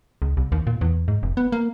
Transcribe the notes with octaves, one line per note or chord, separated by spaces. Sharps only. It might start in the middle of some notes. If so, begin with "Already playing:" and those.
C#2
C2
D#2
A#2
E2
G#2
F1
B3
A#3